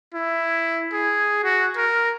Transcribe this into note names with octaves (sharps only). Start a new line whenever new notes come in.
E4
G#4
F#4
A#4